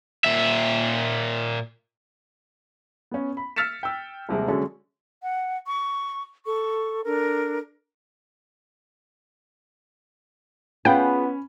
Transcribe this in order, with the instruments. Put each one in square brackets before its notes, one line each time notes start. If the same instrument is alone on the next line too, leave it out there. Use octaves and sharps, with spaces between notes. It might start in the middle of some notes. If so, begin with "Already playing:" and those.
[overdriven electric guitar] A#2 E5
[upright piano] B3 C#4
B5
E6 F6 A6 B6 C#7 E7
G5 E6
D#1 C3 G#3
D3 F#3 G#3 C#4 A4
[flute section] F#5
C#6
A4 C#6
D4 A4 A#4
[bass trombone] B3 [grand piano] C#4 B5 [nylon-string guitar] F4 G#4 F#5 [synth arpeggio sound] G5